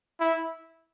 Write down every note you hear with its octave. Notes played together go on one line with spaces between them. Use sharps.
E4